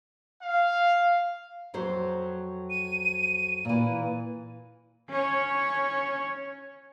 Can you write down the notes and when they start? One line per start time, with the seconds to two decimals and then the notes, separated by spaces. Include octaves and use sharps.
0.42 F5
1.74 F2 F#3 C5
2.70 D#7
3.65 A#2 E3
5.09 C#4 C#5